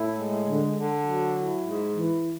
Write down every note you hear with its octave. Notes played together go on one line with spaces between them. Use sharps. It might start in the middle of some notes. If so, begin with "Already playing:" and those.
Already playing: A2 E4
G#3
D3
D3
F#3
E4
G#2
E3